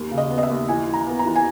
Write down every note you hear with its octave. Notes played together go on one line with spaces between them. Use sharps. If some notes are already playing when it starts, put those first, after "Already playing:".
Already playing: D#2
C#3
D#5
B3
D#5
E5
D#2
E3 G#5
E3
A#5
B3
A#5
E3
G#5